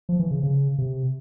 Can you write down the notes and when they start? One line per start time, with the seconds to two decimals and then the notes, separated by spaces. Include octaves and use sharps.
0.09 F3
0.19 E3
0.31 C#3
0.43 C#3
0.78 C3